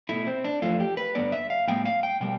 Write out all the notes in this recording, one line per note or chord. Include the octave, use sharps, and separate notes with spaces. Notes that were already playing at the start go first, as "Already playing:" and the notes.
B2 A3 E4
C4
D4
F2 E3 A3 F4
G4
B4
G2 D3 G3 B3 D5
E5
F5
A2 G3 B3 G5
F5
G5
B2 G3 G5